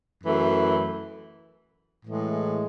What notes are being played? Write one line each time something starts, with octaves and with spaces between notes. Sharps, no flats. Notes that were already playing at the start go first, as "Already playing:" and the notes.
F#2 E3 A3
A2 E3 G#3